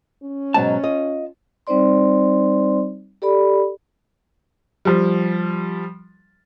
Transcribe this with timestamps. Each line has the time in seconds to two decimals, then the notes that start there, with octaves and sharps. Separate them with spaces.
0.23 C#4
0.54 G#2 B2 F#3 A5
0.83 F4 D#5
1.67 G3 C4 D#4 C5 D5 C6
3.22 G4 A4 D5 B5
4.85 F3 G3